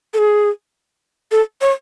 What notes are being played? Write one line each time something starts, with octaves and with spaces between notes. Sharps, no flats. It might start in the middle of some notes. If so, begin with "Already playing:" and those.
A4
G#4
A4
C#5